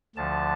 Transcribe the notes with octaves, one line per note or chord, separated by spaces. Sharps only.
D2 D3 F3 A5